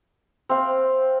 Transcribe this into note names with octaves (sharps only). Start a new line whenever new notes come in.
C4 F5